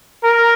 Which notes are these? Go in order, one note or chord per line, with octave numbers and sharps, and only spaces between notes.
A#4